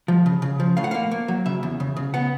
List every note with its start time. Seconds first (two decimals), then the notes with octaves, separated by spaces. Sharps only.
0.08 F3
0.26 C#3
0.42 C#3
0.60 F3
0.77 A2 F5
0.84 F#5
0.91 A#3 F5
1.11 A#3
1.28 F#3
1.46 C#3 E5
1.63 E2
1.80 C#3
1.96 C#3
2.14 B3 F#5